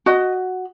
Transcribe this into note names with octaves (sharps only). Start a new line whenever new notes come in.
F#4 D#5